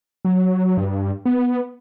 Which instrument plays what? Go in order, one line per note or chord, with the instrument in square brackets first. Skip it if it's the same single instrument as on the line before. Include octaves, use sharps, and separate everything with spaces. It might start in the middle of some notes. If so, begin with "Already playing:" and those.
[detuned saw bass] F#3
G2
B3